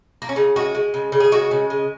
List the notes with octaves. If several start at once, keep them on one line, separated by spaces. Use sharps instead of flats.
A#3
C#4
C#3 D#4
G#3 F#4
G#3
C#3
C#3
G#4
G#3 F#4
C#3
G#3